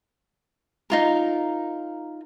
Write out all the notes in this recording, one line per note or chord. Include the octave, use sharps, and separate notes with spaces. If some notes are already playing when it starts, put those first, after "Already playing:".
D#4 F4 A#4